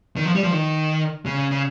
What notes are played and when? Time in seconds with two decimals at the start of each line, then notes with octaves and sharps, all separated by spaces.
0.16 D#3
0.25 F3
0.35 G3
0.43 F3
0.52 D#3
1.26 C#3
1.51 C#3